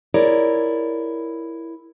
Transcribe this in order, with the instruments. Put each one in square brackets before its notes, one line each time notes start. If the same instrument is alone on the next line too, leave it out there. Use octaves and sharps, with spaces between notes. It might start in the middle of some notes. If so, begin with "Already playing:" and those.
[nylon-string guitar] E4 F4 G#4 A#4 C#5 D5